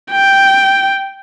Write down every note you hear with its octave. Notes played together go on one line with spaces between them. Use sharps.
G5